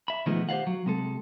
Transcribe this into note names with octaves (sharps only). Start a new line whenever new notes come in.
E5 B5
B2 D#3 F3 G#3 A3 B3
G4 C5 D5 F5 F#5
F#3
C3 G#3 A4